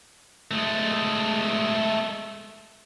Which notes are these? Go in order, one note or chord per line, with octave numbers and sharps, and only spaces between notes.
G#3 A3